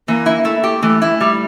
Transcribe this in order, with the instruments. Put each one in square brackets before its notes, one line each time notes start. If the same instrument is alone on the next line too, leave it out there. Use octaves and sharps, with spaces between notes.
[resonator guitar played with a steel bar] E3 [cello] A#3
[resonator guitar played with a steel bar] E4
A3
G4
[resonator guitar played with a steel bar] E3 [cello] A3
[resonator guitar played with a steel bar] E4
G3